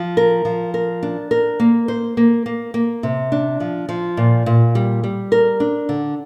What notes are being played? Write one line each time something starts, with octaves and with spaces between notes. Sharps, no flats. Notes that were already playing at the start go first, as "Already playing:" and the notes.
Already playing: F3
A#4
F3
A#4
D4
A#4
A#3
C5
A#3
A#3
A#3
C3
D4
F3
F3
A#2
A#2
G3
G3
A#4
D4
D3